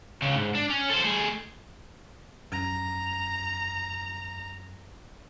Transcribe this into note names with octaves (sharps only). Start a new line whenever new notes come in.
C#2 C#3
G#2
D4
C#4
A4 C5
A3 G#4
F#2 A#5